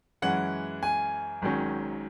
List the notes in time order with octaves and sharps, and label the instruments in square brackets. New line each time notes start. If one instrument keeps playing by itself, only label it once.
[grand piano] F#2 E3 G#3 C#4 F#5
G#5
G#1 G#2 D#3 F#3 C#4